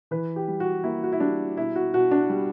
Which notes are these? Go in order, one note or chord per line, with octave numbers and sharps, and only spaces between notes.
E3 B4
G4
G3
F#4
A#3 E4
F#4
E4
G3 D4
B2 E4
F#4
B2 F#4
D4
G3